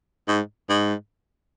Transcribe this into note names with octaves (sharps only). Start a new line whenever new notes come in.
G#2
G#2